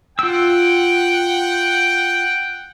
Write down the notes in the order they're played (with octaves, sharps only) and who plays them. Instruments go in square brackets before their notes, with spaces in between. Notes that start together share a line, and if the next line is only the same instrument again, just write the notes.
[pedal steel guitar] F4 E6 [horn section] F#5 G5